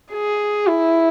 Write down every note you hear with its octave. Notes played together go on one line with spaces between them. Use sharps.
G#4
E4